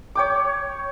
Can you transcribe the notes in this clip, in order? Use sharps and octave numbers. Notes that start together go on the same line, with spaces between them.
C#5 G5 D6